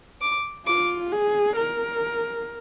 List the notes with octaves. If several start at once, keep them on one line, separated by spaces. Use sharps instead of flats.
D6
F4 D6
G#4
A#4